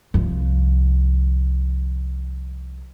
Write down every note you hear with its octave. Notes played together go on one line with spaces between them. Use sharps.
C2 F3